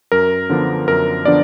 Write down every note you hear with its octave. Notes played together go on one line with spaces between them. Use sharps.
F#2 A#4
D3 F3 B3 D4
F#2 A#4
D3 F3 B3 D4 D5